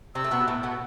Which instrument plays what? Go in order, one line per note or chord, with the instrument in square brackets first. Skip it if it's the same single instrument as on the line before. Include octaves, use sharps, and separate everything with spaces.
[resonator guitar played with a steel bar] C3 C4 [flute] E6
[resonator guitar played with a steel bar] A3
B2 B3
A2 A3
B2 B3